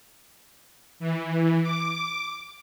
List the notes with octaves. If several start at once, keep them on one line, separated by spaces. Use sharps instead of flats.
E3
D6